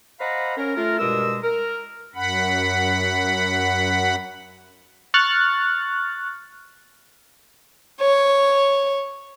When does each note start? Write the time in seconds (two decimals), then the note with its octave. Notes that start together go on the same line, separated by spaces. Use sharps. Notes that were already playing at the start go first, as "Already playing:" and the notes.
0.19 C5 D#5 F5 F#5 A#5 B5
0.57 C#4 A#4
0.75 A3 F4 A#4
0.99 G2 B2 G#3 A#4 D#5 E6
1.43 A#4
2.15 F#2 F#5 B5
5.14 C#6 F6 F#6 A6
8.01 C#5